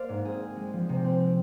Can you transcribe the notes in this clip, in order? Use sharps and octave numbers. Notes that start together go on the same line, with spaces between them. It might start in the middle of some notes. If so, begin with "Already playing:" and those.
Already playing: A#3 C5 D5 F5
G#2
C4 G#4
C4
G#3
F3
C3
C4
C4